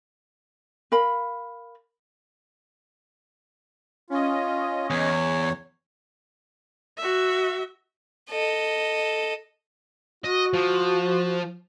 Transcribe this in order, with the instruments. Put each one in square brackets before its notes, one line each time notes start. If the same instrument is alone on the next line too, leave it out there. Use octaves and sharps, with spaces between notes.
[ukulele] A#4 F5 B5
[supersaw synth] C#4 D#5 [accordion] F4
[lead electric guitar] E2 [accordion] C#5
[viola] F#4 E5
[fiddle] A4 D#5
[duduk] F#4 [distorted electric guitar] D#5
[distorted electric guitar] F3